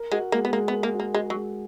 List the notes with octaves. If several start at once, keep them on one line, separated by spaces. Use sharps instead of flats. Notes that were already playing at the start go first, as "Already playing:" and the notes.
Already playing: A#4
G#3 F#4
G#3 A#3
B3
G#3 A#3
B3
A#4
A#3
F#4
A#3
G#3 F#4
F#3
G#3